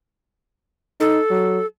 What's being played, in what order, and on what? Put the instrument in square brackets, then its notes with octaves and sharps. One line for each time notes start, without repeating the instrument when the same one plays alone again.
[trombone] D#4 [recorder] A4
[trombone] F#3